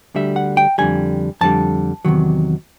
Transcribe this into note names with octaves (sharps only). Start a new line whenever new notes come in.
D2 D3 G3 E5
F#5
G5
F2 D3 G3 G#5
F2 D3 G3 A5
E2 C3 D#3 F#3